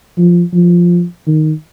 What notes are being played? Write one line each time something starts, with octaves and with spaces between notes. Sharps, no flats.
F3
F3
D#3